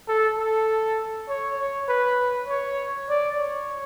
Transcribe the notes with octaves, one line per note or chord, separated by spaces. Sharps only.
A4
A4
C#5
C#5
B4
C#5
D5
C#5